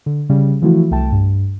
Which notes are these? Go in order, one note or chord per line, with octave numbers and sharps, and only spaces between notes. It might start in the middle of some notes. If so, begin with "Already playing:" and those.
D3
C#3 G3 C#4
E3 F3 A3 E4 F#4
C2 A3 G5 A5
G2